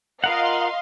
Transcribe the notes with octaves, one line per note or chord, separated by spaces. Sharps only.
F4 A#4 D#5 F5 F#5 C6